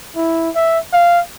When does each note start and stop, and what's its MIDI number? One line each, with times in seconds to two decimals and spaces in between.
0.16 0.50 64
0.55 0.79 76
0.93 1.20 77